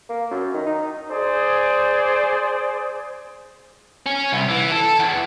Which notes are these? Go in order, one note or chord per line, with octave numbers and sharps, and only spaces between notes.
A#3
F#2
D#3
D#4
G#4 C5 D5 G#5 D#6
C#4
C2
E3
A4
E2